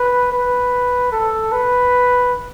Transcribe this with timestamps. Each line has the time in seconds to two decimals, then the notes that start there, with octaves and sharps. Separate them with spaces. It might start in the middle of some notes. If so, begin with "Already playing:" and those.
Already playing: B4
0.32 B4
1.12 A4
1.52 B4